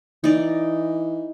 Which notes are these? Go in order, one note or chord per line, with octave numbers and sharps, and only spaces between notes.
E3 D#4 D5